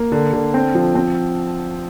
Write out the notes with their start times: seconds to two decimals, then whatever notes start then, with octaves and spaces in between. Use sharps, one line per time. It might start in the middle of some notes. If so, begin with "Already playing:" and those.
Already playing: A#3
0.12 D3
0.33 D3
0.54 C4
0.75 F3
0.95 C4